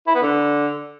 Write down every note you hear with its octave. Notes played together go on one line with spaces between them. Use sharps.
E4
B3
D3